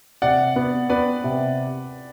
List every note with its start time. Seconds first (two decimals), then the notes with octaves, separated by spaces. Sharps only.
0.22 C3 D5 F#5
0.56 B3
0.90 B3 B4 D5
1.24 C3